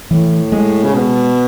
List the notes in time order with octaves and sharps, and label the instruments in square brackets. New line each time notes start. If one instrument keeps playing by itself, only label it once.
[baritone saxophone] A2 [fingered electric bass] E3
[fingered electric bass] G#3
[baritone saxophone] C#3
B2